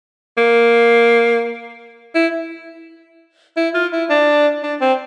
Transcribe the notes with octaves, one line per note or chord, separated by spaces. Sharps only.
A#3
E4
E4
F4
E4
D4
D4
C4